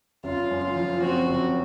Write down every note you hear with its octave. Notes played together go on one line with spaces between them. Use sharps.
F#1 F4
F#2
F4
F3
C4 F#4
F#1